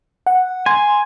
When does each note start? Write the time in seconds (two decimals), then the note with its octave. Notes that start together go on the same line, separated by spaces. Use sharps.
0.27 F#5
0.66 G#5 C6